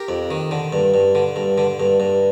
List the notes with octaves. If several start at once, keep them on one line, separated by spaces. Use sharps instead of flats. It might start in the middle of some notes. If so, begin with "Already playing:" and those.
Already playing: G4 A#4
F2
D#3
D3
G2
G2
D3
G2
D3
G2
G2